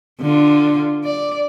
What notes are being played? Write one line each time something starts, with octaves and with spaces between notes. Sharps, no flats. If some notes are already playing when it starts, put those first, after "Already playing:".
D3 F4
D5